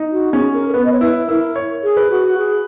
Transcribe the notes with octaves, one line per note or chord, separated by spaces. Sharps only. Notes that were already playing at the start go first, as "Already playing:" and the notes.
Already playing: D#4
F#4
C#4 G#4
A#4
A#4
B3 B4
D#5
C#5
E4 B4
E4 A#4
C#5
G#4
B4
F#4
G#4